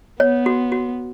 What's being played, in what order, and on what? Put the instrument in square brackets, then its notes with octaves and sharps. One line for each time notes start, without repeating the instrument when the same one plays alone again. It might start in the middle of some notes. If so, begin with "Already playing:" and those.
[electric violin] B3 [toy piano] C#5
[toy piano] F#4
F#4